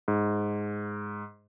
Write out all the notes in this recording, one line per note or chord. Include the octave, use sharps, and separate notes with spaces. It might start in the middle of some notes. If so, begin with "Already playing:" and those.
G#2